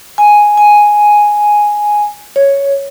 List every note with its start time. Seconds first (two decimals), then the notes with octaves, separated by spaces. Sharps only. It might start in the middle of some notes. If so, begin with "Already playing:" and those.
0.18 G#5
0.57 G#5
2.36 C#5